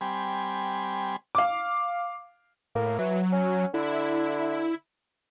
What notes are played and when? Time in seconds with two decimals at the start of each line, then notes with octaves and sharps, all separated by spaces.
0.01 G3 C4 G#5 B5
1.35 F5 D6
2.75 A2 A#3
2.99 E3 F#3
3.32 C#4
3.74 D3 E4